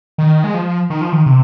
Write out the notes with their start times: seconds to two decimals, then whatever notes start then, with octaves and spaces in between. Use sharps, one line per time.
0.18 D#3
0.44 G#3
0.54 F3
0.90 D#3
1.01 F3
1.12 D#3
1.26 C3